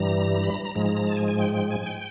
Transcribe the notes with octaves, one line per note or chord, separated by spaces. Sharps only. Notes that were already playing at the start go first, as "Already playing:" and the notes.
Already playing: G2 E3 G3 A#5
B5
A#5
A#5
G#2 F3 G#3 A#5
A#5
A#5
A5
G#5
G#5
G5
G5
G#5
G5